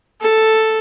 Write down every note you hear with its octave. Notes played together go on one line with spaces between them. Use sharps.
A4